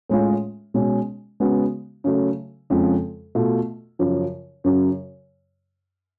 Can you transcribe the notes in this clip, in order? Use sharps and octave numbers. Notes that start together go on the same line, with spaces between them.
A2 G#3 C#4 F4
B2 G#3 C#4
C#3 G#3 B3 F#4
C#3 F#3 A3
F2 C#3 F3 G#3
B2 A3 F4
F#2 C#3 F3
F#2 C#3 F#3